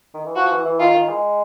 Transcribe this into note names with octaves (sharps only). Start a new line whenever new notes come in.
D#3
E3
F3 F#4
E3
E3
D#3 F4
D#3
G#3